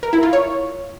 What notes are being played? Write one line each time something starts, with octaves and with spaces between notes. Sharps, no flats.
A#4
E4
F4
C#5